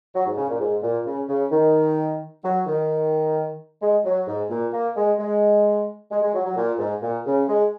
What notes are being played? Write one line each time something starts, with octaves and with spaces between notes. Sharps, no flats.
F#3
G#2
C#3
A#2
G#2
A#2
C#3
C#3
D#3
F#3
D#3
G#3
F#3
G#2
A#2
A#3
G#3
G#3
G#3
G#3
F#3
F#3
A#2
G#2
A#2
C#3
G#3